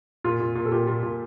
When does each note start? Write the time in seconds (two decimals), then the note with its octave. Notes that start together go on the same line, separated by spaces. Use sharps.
0.24 A#2 F4
0.40 A#2
0.55 A#2
0.65 A4
0.72 A#2 G4
0.87 A#2
1.03 A#2